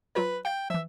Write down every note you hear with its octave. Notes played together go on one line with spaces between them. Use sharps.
F#3 F4 B4 C5
F5 G5 G6
E3 F3 E5